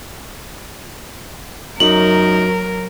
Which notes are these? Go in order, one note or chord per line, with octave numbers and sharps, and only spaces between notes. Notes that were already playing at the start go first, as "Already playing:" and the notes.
F#2 F#3 D#4 A#4 F#7